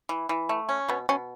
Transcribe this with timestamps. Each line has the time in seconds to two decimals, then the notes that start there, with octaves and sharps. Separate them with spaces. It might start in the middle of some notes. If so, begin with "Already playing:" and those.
0.09 E3
0.29 E3
0.49 A3
0.69 C#4
0.88 B2 B3
1.09 B2 C#4